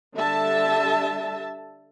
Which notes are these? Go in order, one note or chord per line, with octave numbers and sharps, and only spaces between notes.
D3 G3 E5 A5